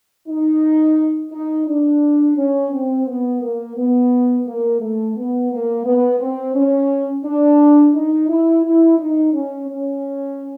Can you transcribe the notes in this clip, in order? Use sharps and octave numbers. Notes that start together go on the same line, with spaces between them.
D#4
D#4
D4
C#4
C4
B3
A#3
B3
A#3
A3
B3
A#3
B3
C4
C#4
D4
D#4
E4
E4
D#4
C#4
C#4